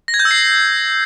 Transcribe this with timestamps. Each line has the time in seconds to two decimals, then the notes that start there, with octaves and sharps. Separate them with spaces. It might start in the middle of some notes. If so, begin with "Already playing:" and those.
0.08 A#6
0.14 G#6
0.19 G6
0.25 E6
0.31 C7